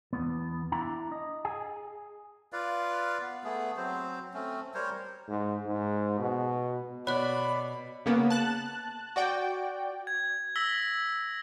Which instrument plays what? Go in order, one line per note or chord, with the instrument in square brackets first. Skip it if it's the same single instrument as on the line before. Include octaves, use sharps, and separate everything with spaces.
[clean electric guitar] E2 B3
D4 E4 E5 A#5
D#5
G#4 G#5
[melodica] F4 B4 D5 F5
B3
A3 B3 G#4
F#3 C4 C5
A3 C4 C#4
G3 A#4 C5 C#5
[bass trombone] G#2
G#2
B2
[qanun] B2 [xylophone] C#5 F#6 [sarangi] D5 [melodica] B5
[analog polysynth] C#3 A#3 B3
A5 F#6
F#4 D5 G5
[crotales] G#6
E6 A#6 B6 F#7 G7